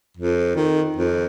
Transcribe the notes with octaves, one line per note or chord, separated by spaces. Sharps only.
F2
D#3
F2